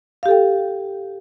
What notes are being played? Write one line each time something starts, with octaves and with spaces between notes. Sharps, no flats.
G4 A4 F5 G5